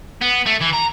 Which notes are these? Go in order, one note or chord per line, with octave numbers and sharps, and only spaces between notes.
B3
A3
E3
A#5